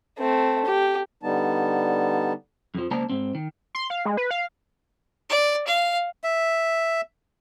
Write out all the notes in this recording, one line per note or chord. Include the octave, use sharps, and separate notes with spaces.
A3 C4
G4
D3 G3 B3 D#4 A5
F2 F3
C#2 A#3 C5 D5 A5 A#5
G#2 C4
D#3
C6
F5
G#3
B4
F5
D5
F5
E5